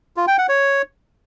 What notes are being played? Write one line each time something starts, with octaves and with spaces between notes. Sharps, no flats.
F4
G5
F#5
C#5